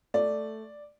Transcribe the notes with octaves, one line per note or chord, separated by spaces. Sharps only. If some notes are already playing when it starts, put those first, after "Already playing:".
A3 D5